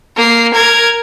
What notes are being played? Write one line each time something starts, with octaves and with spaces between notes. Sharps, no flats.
A#3 C7
A#4 G#6